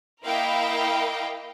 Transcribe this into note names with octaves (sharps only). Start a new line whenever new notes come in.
A#3 E4 A#4 D#5 F5 G5